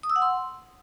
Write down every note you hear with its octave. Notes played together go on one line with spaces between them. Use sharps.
D#6
E6
F#5
C6